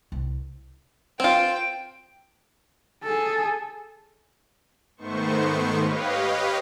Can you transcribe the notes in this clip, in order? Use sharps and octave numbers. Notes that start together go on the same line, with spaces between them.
C2
C4 F4 G5
G#4 A4
G#2 D#3 A3 B3 C5 C#6
G4 B4 C#5 D#5 F5